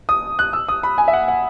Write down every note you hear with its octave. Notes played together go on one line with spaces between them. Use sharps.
D#6
F#6
E6
D#6
B5
G#5
E5
F#5
F#5